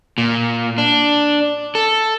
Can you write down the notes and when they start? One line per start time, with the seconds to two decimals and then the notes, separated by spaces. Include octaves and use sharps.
0.18 A#2
0.78 D4
1.75 A4